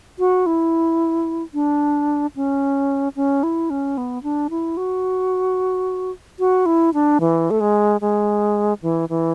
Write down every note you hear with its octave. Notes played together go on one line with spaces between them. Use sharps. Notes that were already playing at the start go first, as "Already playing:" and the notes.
F#4
E4
D4
C#4
C#4
E4
C#4
B3
D4
E4
F#4
F#4
E4
D4
E3
A3
G#3
G#3
E3
E3